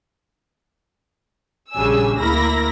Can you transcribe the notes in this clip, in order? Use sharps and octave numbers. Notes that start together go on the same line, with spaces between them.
A#1 C#3 G3 D4 G#5 E6
D2 A#3 E4 A#4 B5 A#6